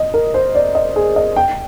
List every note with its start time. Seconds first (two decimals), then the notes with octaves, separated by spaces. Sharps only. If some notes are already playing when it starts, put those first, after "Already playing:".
Already playing: D#5
0.14 A#4
0.34 C5
0.55 D5
0.75 D#5
0.96 G#4
1.16 D#5
1.36 G5